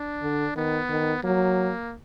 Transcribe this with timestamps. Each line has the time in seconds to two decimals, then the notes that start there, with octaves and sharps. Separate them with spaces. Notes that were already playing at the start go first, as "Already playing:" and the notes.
Already playing: D4
0.22 D3
0.56 D#3 B3
0.90 D#3
1.23 F#3 A#3